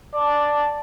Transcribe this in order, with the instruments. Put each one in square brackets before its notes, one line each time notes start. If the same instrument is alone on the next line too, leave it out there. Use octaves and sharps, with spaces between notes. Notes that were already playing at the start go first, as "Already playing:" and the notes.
[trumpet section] D5 A5